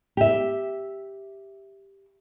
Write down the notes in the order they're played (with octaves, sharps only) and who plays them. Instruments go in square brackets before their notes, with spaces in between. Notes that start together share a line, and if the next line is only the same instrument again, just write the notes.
[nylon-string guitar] G4 E5